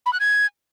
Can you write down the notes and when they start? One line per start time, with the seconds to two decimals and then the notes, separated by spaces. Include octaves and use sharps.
0.06 B5
0.13 F#6
0.20 G#6